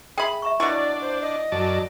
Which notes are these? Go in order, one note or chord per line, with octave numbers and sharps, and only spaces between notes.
G#4 E5 G5 B5
E5 A#5 C#6
B2 F#3 D4 E4 D5 C#6
C5
D#5
F#2 D5 A5